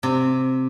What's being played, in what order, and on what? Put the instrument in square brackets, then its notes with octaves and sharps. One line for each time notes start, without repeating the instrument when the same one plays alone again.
[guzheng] C3